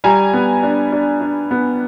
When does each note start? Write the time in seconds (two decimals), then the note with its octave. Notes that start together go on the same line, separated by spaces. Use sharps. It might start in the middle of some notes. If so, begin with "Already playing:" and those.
0.04 G3 G#5 A#5
0.33 B3
0.63 D4
0.92 D4
1.21 D4
1.51 B3